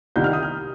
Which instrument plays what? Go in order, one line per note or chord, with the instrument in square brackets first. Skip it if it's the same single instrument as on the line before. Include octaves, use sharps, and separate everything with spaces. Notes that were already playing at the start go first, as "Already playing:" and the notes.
[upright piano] C2 C3 D#3 G6
F6
D#6
F6